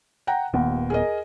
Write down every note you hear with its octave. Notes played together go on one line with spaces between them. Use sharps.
F#5 G5 A#5
D#1 D#2 B3
G#4 A#4 D#5